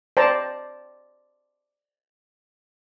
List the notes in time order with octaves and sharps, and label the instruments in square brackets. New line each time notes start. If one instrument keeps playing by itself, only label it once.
[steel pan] C5 D5 G5 A5 A#5